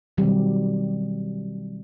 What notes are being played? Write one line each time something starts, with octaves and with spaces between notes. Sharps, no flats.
B2 D#3 F#3 G3 C4 G4